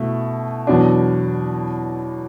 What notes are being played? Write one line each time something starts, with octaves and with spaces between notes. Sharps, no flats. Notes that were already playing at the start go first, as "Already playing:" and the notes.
Already playing: B2 A3 E4
E2 B2 F#3 B3 D4